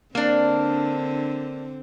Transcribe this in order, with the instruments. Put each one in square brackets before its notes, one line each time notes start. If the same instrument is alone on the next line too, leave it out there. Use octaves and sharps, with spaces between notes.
[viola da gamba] D3 C4 [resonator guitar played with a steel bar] A#3 D4